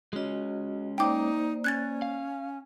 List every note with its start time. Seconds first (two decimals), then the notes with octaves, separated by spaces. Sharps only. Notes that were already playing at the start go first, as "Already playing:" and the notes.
0.13 G#3 C#4 F#4 D#5
0.98 A#3 D#4 C5 D5 G5 D6
1.64 C#4 F#6 G#6 A6
2.02 F5